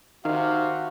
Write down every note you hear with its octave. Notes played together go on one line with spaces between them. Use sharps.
C3 D#3 F#4 F5